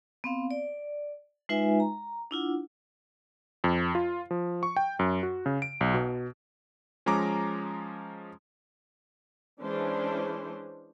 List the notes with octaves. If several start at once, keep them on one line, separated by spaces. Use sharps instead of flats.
B3 C4 F5
D5
G#3 D#4 F4 B4 E5 G#5
A#5
D4 E4 F4 F#5
F2
F4
F3
C#6
G5
F#2
F#4
C#3
D7
B1
B2
F3 G#3 C#4 A#5 D6
E3 G#3 C#4 D4 C5